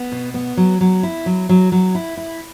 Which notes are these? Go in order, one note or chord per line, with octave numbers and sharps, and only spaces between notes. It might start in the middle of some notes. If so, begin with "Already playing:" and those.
Already playing: B3
B2
B3
F#3
F#3
E4
F#3
F#3
F#3
E4
E4